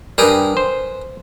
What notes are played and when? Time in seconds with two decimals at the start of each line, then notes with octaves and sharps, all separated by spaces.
0.18 G2 G3 G#4 A#4 B4
0.57 C5